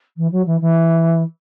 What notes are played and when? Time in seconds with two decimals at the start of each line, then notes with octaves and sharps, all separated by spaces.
0.16 E3
0.31 F#3
0.46 E3
0.60 E3